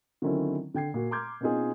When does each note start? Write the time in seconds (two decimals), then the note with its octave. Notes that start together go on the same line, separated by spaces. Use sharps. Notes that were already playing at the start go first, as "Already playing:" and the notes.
0.22 D3 D#3 F#3 C4 C#4 E4
0.74 D3 G5 G#6 C7
0.94 A#2 F#4
1.11 A#5 C6 D6 F6 G6 G#6
1.41 B2 C4 C#4 D#4 F4 G#4